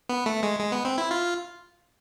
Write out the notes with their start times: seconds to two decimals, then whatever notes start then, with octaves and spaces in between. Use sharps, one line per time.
0.09 B3
0.26 A3
0.43 G#3
0.60 G#3
0.72 B3
0.85 C4
0.98 E4
1.11 F4